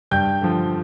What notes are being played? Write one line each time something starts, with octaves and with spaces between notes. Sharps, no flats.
G2 G5 G6
D3 F3